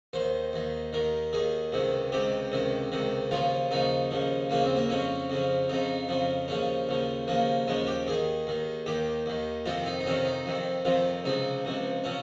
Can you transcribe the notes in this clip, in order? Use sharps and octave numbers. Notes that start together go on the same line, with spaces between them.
D#2 D#3 C5
D#2 D#3
D#2 D#3 A#4
D#2 D#3 G#4
C#2 C3 D#3
C#2 C3 D#3 G4
C#2 C3 D#3
C#2 C3 D#3
D#2 C#3 F3 F4
D#2 C#3 F3 D#4
D#2 C#3 F3
D#2 C#3 F3 A#3
C4
A#3
F2 C#3 F3 C#4
F2 C#3 F3
F2 C#3 F3 D#4
F2 C#3 F3
D#2 C#3 F3 C#4
D#2 C#3 F3
D#2 C#3 F3 A#3
D#2 C#3 F3 G#3
G4
D#2 D#3 G#4
D#2 D#3
D#2 D#3 G4
D#2 D#3
F2 C3 D#3 F4
D#4
D#4
F2 C3 D#3 C#4
D#4
F2 C3 D#3
F2 C3 D#3 F4
C#2 C3 F3 D#4
C#2 C3 F3
C3 F3 C#4